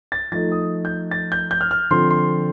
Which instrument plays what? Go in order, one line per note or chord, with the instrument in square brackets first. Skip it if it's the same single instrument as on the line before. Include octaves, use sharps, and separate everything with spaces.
[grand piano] A6
F3 A3 D#4 A6
D#6
G6
A6
G6
G6
F6
F6
D3 F3 C4 C6
C6